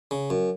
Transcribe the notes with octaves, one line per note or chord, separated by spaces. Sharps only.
C#3
F#2